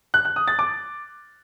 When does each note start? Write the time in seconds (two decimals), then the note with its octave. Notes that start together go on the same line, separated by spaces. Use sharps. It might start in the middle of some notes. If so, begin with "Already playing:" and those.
0.14 F#6
0.25 F#6
0.36 D#6
0.48 A6
0.59 D6